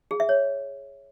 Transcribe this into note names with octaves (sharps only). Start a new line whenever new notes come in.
G#4
E5
C#5